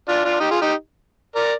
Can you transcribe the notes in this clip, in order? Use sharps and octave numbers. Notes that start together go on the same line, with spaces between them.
D4 F4
D4 F4
D#4 G4
F4 G#4
D#4 G4
A#4 D5